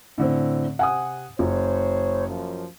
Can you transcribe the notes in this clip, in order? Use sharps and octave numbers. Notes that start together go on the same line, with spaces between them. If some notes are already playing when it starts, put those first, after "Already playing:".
A2 D3 C4
C3 F#5 G#5 D#6
F#1 C5 C#5
F#2 F3